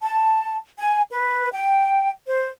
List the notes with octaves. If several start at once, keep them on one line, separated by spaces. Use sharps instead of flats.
A5
G#5
B4
G5
C5